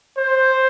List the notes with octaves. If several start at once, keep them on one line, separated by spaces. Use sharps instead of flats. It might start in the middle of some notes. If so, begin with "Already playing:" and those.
C5